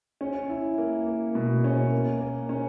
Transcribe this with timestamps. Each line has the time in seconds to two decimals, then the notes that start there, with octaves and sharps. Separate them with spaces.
0.21 C#4
0.49 E4
0.78 A#3
1.06 A#3
1.35 B2
1.64 C#4
1.92 A#3
2.21 A#3
2.49 C#4